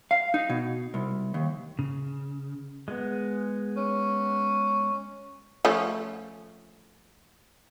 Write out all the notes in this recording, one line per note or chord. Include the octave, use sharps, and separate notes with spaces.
F5
D#4
B2
C2
D#2
C#3
G#3 B3
C#4
F3 A3 C#4